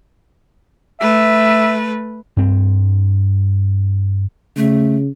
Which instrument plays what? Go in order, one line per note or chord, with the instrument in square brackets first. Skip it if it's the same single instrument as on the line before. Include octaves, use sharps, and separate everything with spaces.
[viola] A3 B4 [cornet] E5
[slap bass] G2 C4
[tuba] C#3 [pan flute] A3